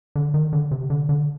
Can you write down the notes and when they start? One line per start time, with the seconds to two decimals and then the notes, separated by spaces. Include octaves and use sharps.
0.16 D3
0.34 D#3
0.53 D3
0.71 C3
0.90 D3
1.09 D3